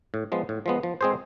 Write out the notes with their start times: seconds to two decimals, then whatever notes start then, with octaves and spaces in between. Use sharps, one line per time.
0.14 A2
0.32 F3 G#3 B3
0.49 A2
0.66 F3 G#3 B3
0.83 F3
1.01 G#3 C4 G#4 C5